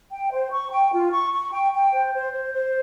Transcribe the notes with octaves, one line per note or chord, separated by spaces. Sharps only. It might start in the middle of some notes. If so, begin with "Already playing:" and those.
G5
C5
C#6
G5
F4
C#6
C#6
G5
G5
C5
C5
C5
C5